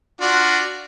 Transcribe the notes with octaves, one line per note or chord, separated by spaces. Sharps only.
D4 F4 F#4